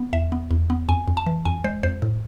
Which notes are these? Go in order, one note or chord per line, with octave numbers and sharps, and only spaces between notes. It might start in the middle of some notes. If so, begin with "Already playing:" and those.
Already playing: B3
E2 E5
B3
E2
B3
F2 G#5
F2
A5
E3
F2 G#5
G#3 C5
F2 C5
A2